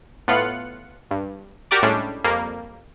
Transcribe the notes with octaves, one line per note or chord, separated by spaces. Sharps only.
A2 B3 F4 F#6 C#7
G2
F#4 G4 A#4 D5 D6
A2 G3 G#3 C#4 D4
F2 G3 A#3